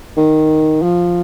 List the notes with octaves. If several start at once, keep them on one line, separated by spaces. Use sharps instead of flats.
D#3
F3